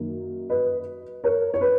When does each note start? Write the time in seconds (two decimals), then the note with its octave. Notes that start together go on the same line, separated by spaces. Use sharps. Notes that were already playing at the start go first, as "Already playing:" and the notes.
Already playing: F#2 D#3 F#3 A#3
0.50 B4 D#5
1.24 A#4 C#5
1.54 C#5
1.61 B4